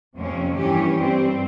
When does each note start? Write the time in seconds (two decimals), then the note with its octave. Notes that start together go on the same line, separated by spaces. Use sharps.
0.17 F2 C3 F3 A#3 C#4
0.57 G2 E3 A#3 C#4 G4
0.98 G2 G3 C4